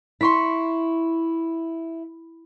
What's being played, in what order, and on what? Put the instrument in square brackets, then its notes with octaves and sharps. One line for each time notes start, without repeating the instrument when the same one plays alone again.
[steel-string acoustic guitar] E4 [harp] C6 C#6 B6